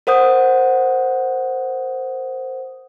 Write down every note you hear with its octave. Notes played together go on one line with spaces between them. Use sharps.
A#4 C5 F#5 D#6 G6